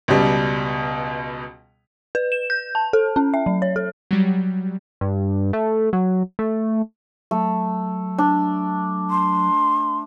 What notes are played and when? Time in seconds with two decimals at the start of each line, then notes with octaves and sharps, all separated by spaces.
0.08 C#2 B2 G3
2.15 B4
2.32 E7
2.50 G6
2.75 A5
2.93 A4
3.16 C#4
3.34 E5
3.46 F#3
3.62 C#5
3.76 A4
4.11 F#3 G3
5.01 G2
5.53 A3
5.93 F#3
6.39 A3
7.31 F#3 A3
8.18 D4
9.10 C6